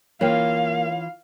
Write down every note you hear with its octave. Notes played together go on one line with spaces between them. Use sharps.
E3 A#3 F4 C#5 F5 G5